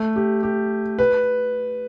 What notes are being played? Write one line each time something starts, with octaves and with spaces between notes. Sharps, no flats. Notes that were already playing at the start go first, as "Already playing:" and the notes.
Already playing: A3
G4
G4
B4